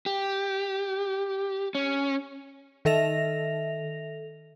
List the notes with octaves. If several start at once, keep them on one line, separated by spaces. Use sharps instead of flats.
G4
C#4
D#3 A4 E5 A#6 F7